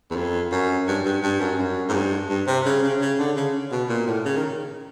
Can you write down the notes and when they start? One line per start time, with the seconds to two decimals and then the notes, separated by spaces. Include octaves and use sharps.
0.10 E2
0.16 F2
0.52 F#2
0.87 G2
1.05 G2
1.23 G2
1.40 F#2
1.58 F#2
1.88 G#2
1.93 G2
2.29 G2
2.47 C3
2.65 C#3
2.82 C#3
3.01 C#3
3.19 D3
3.36 C#3
3.72 B2
3.89 A#2
4.07 A2
4.25 C#3
4.36 D#3